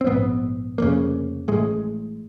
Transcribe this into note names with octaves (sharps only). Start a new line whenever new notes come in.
C4
A#1 G#2 B3
F1 F2 C#3 A#3
A1 A2 G#3